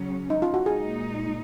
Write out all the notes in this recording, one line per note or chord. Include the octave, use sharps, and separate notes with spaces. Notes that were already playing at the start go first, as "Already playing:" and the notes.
Already playing: C#3 F#3 C#4
D#4
F4
F#4
A#2 G#3 D#4 G#4